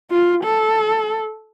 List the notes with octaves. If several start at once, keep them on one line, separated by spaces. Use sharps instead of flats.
F4
A4